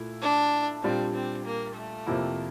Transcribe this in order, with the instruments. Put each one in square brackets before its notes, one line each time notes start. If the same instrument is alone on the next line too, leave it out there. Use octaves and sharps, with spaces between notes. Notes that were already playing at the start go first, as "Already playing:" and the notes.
Already playing: [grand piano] A#2 A3 E4
[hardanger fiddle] D4
[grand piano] A#2 G3 D4 [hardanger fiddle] C4
[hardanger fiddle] C4
A#3
A3
[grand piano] F2 C3 F3 A#3 E4